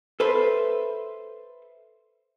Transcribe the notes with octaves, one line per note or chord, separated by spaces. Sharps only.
A4 B4 C5 E5